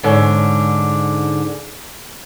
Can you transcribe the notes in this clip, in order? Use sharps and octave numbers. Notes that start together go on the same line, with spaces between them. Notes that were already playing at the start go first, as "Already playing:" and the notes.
G#2 D3 C#4